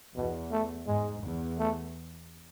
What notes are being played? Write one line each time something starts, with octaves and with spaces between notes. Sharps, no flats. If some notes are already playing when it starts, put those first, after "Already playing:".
E2 B2
A3
G#2 G#3
E2
A3